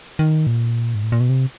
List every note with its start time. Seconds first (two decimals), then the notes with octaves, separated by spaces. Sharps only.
0.19 D#3
0.47 A#2
0.95 G#2
1.03 A2
1.12 A#2
1.20 B2
1.29 C3